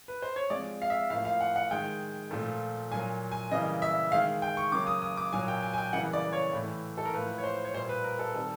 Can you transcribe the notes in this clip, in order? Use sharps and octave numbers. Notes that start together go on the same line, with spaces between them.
B4
C5
C#5
C3 F3 G#3 D5
F5
E5
A2 F3 A#3 F5
F5
F#5
F#5
D#3 G#3 G5
A#2 F3 A3
A#2 F#3 A#3 G#5
G#5
C#3 E3 G3 A#3 D#5
E5
D#3 G#3 F5
G5
C#6
C#3 F#3 A#3 D6
D#6
D#6
D6
A#2 F#3 A#3 G#5
G5
G#5
G#5
G5
C#3 E3 G3 A#3 F#5
D5
C#5
A2 E3 A3
A4
A#4
A2 F3 A#3 B4
C#5
C5
C#5
A#2 G3 A#3 C5
B4
A#4
A4
C3 D#3 G3 A4